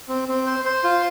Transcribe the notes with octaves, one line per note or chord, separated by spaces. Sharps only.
C4
C4
C5
C5
F4